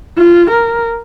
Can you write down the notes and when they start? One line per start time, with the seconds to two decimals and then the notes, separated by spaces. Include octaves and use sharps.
0.18 F4
0.51 A#4